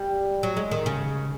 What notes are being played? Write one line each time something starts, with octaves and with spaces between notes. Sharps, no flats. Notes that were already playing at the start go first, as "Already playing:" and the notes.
Already playing: G3
F#3
G#3
D#3
C#3